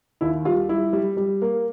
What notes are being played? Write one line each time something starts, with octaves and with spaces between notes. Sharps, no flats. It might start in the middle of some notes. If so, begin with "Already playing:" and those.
D#2 E4
G3 F4
G3 E4
G3
G3
A#3